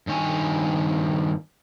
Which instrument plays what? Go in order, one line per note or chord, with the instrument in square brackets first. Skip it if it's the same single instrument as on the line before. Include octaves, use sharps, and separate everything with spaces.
[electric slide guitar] G2 D#3 C#5 G#5